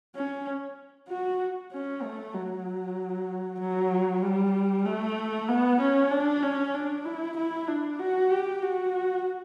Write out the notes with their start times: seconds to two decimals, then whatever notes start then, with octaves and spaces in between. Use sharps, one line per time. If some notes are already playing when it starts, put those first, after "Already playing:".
0.15 C#4
1.09 F#4
1.72 C#4
2.03 A3
2.34 F#3
3.60 F#3
4.22 G3
4.85 A3
5.48 B3
5.80 C#4
6.11 D4
6.42 C#4
6.74 D4
7.05 E4
7.36 E4
7.68 D4
7.99 F#4
8.31 G4
8.62 F#4